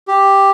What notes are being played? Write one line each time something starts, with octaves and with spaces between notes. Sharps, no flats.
G4